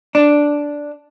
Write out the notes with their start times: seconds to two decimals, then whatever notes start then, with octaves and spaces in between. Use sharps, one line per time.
0.15 D4